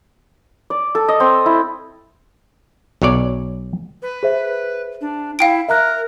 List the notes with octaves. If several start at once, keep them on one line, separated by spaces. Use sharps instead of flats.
D5
A4
D#5
C4
E4
B1 F#3 C#5 D5
B4
G#4 C5 E5
D4
E4 F5 G5 D7
A#4 E5 A#5 F#6